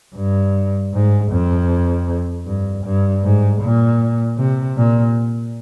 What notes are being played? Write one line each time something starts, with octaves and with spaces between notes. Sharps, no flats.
G2
G#2
F2
G2
G2
G#2
A#2
C3
A#2